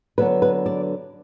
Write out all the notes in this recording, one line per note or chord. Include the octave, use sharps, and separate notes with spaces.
D3 F#3 B3 B4
B4
D5